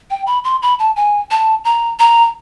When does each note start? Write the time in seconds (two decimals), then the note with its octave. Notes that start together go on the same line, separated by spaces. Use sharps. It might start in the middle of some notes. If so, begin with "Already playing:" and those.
0.10 G5
0.27 B5
0.44 C6
0.62 B5
0.79 A5
0.96 G#5
1.31 A5
1.65 A#5
1.99 A#5